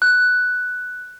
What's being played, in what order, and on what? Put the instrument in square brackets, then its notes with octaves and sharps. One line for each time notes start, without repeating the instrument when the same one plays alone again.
[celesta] F#6